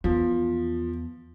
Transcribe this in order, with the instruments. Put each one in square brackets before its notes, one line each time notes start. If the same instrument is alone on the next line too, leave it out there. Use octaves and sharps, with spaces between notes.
[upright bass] E2 [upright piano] F3